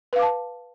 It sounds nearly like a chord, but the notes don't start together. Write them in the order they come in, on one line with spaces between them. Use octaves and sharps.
B4 F5 D6 A5